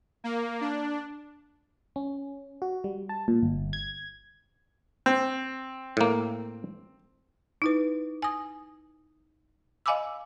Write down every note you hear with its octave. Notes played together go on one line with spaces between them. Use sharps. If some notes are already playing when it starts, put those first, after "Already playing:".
A#3
D4
C#4
F#4
G3
A5
A#2
G1
G#6
C4
A2 A#3
D#4 E4 B4
G#5 D#6
D#5 F5 G#5 B5 D6 E6